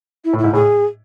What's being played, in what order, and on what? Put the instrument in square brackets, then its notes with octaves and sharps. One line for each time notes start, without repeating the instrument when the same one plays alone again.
[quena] E4
[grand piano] A2
[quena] E4
[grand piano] G#2
[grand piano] A2 [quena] G#4